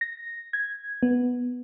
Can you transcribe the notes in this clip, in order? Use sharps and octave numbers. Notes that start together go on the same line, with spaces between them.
A#6
G#6
B3